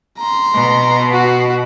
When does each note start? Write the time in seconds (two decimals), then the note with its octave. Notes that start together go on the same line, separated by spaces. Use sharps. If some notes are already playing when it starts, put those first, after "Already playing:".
0.19 A#5 C6
0.54 B2
1.12 F#4